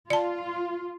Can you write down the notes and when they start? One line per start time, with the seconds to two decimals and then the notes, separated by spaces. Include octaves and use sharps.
0.10 F4 D5 A5